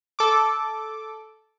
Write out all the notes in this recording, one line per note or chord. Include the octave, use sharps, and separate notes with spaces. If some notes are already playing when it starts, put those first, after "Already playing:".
A4 D6